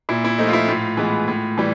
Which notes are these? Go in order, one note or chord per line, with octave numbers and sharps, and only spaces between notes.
A#2 E4
E4
F3 A3 D#4
F4
E4
A2 F4
E3 G#3 B3
A2
E3 G3